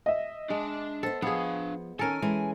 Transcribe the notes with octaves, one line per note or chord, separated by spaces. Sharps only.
D#5 E5
G#3 D4 A5
B3 A4 C5
F3 B3 D4 G#4 F5
D#3 C#4 A4 A#4 G#5
E3 G#3 C#4